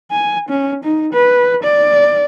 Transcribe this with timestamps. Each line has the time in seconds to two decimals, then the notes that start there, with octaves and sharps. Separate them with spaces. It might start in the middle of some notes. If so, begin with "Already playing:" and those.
0.11 G#5
0.49 C#4
0.84 D#4
1.13 B4
1.63 D5